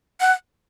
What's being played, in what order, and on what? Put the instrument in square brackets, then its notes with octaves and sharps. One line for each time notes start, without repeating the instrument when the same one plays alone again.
[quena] F#5